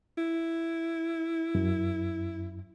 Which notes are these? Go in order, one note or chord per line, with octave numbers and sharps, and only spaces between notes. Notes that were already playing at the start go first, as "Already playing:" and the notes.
E4
F#2